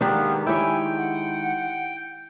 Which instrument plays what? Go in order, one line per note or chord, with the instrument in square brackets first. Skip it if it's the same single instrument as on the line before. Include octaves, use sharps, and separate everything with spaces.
[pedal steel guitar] D#3 G#3 [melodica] A#3 B3 [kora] D4 G4
[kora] E4 G4 C#5 [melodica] G5 [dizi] G#5
[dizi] F#5